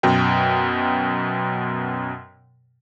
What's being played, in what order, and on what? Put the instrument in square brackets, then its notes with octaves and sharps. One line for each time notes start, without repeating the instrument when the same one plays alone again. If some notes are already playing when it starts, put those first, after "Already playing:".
[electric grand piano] F#2 B2 G5